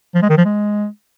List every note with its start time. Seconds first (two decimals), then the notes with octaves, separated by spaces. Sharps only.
0.15 F3
0.22 G#3
0.30 D#3
0.37 F3
0.45 G#3